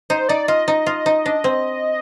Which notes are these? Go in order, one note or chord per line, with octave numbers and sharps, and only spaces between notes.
D#4 C5
D#4 D5
F4 D#5
D#4
F4
D#4
D4
C4